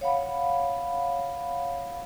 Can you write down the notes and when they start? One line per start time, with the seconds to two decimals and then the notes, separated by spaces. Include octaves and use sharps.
0.01 C#5 F5 F#5 B5